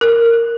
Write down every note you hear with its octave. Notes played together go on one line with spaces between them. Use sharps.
A#4